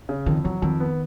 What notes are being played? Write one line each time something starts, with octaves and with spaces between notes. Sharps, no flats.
C#3
F2 D#3
E3 F#3
F2 D#3
B3